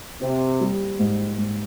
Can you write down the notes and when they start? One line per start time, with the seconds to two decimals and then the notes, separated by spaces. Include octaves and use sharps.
0.21 C3 C4
0.60 G3
0.99 G#2
1.38 G#2